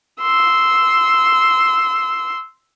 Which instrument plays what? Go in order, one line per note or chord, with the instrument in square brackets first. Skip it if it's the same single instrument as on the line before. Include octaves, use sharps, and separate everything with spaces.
[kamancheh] C6 E6